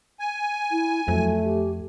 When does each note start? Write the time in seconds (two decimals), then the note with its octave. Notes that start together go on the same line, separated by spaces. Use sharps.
0.20 G#5
0.71 E4
1.08 F2 F#3 A3
1.44 G4